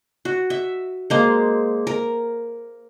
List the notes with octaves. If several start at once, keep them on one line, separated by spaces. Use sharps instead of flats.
F#4
E5
G#3 A#3 C5
A#4